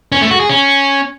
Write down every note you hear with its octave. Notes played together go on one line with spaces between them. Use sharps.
C#4
A3
F#4
G#4
C#4